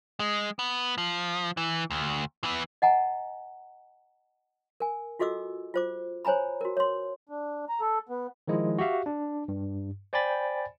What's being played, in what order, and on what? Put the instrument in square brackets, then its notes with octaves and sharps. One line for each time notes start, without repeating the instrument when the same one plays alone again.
[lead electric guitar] G#3
B3
F3
E3
D2
E3 B3
[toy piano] D#5 F#5 G#5 A#5
A#4 G#5
F4 F#4 A4 D#5 D6 E6
F4 C5 D6
C5 C#5 G#5 A#5 B5
F#4 A#4
C#5 C6
[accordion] D4
A#5
A4
B3
[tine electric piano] D#3 F3 G#3 E4
F#4 G4 E5 F5
D4
G2
C5 D5 G5 G#5 B5 A6